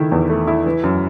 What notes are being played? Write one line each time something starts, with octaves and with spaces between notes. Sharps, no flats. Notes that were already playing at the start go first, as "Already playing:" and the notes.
Already playing: D#3 A3 E4
E2
A3
E4
E3
F#2